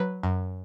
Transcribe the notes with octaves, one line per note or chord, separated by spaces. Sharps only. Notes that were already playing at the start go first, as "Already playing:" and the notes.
Already playing: F#3 B4
F#2